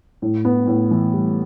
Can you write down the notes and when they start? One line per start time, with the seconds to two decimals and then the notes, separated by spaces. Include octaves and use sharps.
0.22 A2
0.45 B3
0.67 A2
0.91 E3
1.14 G3